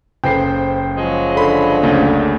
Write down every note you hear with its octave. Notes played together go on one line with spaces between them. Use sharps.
F#1 A4 B4 C5 G5 C7
F3 F#3 G#3
D3 B5 C6
D2 C#3 A#3